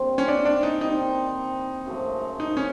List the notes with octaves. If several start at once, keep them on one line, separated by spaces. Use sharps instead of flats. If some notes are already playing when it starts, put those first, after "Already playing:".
Already playing: D3 G3 A#3 C4
C#4
D4
D4
D#4
D#3 G3 C4 D#4
F#2 C#3 F3 A3
D#4
C#4